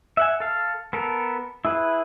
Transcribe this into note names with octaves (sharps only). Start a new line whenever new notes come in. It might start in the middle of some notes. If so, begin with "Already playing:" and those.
E5 F#5 G#5
A4 F5
B3 A4 A#4
E4 G#4 B4